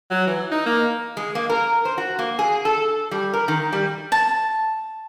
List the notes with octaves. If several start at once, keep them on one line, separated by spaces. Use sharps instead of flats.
F#3
E3
D#4
A#3
G#3
A#3
A#4
C5
F#4
A#3
G#4
A4
G3
A#4
D#3
G3
A5